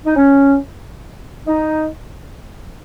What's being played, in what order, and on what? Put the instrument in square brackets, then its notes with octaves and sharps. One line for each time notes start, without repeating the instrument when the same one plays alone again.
[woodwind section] D#4
C#4
D#4